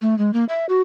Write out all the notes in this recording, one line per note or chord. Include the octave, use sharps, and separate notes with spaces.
A3
G#3
A#3
E5
F#4